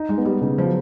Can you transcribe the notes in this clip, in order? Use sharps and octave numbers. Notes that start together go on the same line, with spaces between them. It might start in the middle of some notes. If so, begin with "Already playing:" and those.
Already playing: D#4
G#3
B3
G3
C#3
F3
F#3